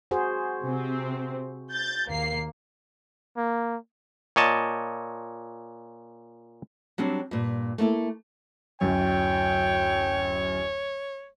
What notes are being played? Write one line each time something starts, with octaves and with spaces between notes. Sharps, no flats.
F#4 G#4 C5
C3 C4
G6 A6
D#2 A#3 C7
A#3
A#2 C#5 D#5 A5
F#3 G3 C4 D4
G2 A#2
A3 A#3 E4 A4
D1 F#2 C#5 G5